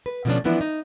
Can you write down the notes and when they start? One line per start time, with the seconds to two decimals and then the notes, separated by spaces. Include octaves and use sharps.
0.06 B4
0.25 B2 D3 F3 A3 C#4 D4
0.44 E3 F3 B3 D4 E4
0.61 D#4